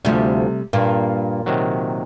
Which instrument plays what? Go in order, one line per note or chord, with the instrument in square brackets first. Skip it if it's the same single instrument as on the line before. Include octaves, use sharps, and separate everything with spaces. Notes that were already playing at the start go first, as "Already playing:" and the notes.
[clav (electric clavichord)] D2 F3 [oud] C3 G3 A3
[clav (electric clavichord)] G2 A#3 [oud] A#2
[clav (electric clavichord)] C3 D#3 F#3